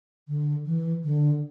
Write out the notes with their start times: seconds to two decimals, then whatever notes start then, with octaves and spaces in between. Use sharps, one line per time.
0.28 D3
0.66 E3
1.04 D3